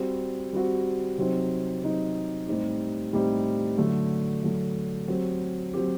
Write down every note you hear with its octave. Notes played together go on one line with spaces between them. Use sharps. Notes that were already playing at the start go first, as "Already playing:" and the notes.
Already playing: G3 C4 F#4
G3 C4 F#4
C3 F#3 C4 D#4
C3 F#3 C4 D#4
A2 G3 C4 D#4 G4
A2 G3 C4 D#4 G4
D3 F#3 A3
D3 F#3 A3
F#3 C4 G4
F#3 C4 G4